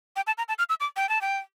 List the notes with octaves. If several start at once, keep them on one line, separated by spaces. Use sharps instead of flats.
G5
A5
A#5
A5
F6
E6
D6
G5
A5
G5